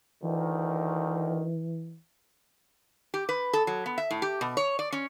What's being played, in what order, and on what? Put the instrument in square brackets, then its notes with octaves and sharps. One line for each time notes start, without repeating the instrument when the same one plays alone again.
[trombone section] D2 D#3 [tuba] E3
[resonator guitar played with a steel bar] G4
B4
A4
F#3
B3
E5
A2
G4
B2
C#5
D5
C#4